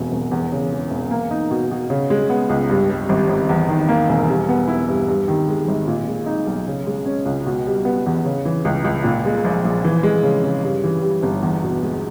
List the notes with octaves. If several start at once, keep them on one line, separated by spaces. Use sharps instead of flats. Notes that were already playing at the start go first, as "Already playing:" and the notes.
Already playing: E1 E2 B2
E1
E2
C#3
E3
E1
A#3
D#4
B2
B2
C#3
G#3
B3
C#2
G2
G3
G#1
G#1
E2
D#3
A#3
E1
G3
B3
E4
G2
G2
D#3
G#3
G#1
A#2
G#3
D#4
B1
C#3
G#3
C#4
C#2
B2
G3
B3
E2
C#3
E3
C#2
C#2
A#2
G#3
A#1
A#1
E3
G#3
C#3
C#3
G2
E3
G3
G1
E2
B2
G#3